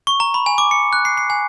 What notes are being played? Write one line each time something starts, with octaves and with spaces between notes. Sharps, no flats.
C#6
A#5
B5
G#5
D6
C#7
F#6
C7
C7
G#5